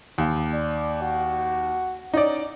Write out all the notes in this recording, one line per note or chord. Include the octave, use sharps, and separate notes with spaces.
D#2
D5
F#4
C#4 D#4 D5